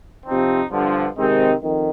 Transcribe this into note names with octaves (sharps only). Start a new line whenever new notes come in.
C3 F3 C4 D#4
G2 D3 F3
C3 D#3 G#3 C4 D#4
F2 D#3